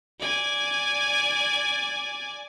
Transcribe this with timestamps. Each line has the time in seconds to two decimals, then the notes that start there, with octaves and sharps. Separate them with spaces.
0.20 D5 G#5